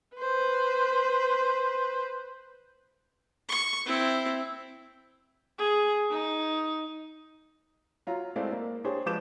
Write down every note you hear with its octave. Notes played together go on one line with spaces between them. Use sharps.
B4 C5
C#6
C4 E4
G#4
D#4
F#3 F4 A#5
G#3 A3 C4 E4 D5 F5
A#3
D4 G4 G#4 C5 C#5
F3 G#3 B4 D6 G6 E7